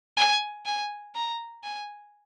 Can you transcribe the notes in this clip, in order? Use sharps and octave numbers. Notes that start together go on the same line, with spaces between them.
G#5
G#5
A#5
G#5